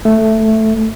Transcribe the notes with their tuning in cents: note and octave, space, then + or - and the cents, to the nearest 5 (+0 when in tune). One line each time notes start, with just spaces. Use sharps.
A3 +0